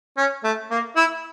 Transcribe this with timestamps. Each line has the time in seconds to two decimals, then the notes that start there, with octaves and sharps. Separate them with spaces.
0.17 C#4
0.44 A3
0.70 A#3
0.96 E4